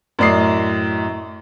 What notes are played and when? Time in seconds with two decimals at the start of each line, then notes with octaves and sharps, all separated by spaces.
0.19 F#2 A2 D5 D#5 C7